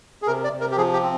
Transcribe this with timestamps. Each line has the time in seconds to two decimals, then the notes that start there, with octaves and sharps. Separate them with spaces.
0.22 G#4
0.27 C3 A#4
0.44 D5
0.52 C3
0.61 A#4
0.71 G4
0.77 F3 G#4
0.93 G4
1.02 C4